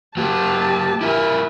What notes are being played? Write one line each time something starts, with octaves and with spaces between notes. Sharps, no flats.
F#3 A#3 F#4 G4 A5
E4 A#4 E5 G#5